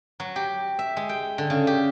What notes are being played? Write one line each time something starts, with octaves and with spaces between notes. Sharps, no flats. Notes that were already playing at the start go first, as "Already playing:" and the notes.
F#3
G4
E5
G#3
G5
D3
C#3
G4